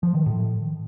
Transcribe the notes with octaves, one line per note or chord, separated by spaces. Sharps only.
F3
D#3
A2